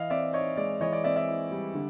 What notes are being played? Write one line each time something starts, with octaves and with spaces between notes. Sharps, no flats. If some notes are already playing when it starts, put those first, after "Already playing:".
Already playing: E3 D#5 F5
C4 D5 E5
D#4 C#5 D#5
G#3 D5
E3 C#5 D#5
D5
C4 D5 E5
D5 E5
E4
G3
D3